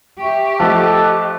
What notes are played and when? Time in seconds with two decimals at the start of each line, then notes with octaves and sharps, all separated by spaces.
0.20 G4 E5 C#6
0.60 F3 A3 A4 D#5 D6 F#6